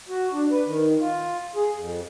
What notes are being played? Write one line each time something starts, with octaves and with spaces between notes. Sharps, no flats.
F#4
D4
B4
D#3
F4
G#4
F2